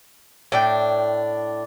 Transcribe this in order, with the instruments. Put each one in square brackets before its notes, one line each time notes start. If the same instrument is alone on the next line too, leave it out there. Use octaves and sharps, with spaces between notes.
[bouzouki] A2 D4 G5